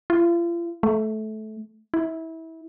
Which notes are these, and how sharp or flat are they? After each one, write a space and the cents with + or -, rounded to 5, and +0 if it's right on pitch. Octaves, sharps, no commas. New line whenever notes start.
F4 -40
A3 -20
E4 -25